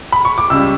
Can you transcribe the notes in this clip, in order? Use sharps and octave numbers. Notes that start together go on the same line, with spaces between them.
B5
C#6
D6
C#2 C#3 G3 E6